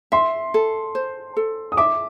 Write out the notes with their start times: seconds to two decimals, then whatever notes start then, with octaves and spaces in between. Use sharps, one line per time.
0.12 E5 C6
0.54 A4
0.95 C5
1.37 A4
1.72 D#6
1.77 E5 D6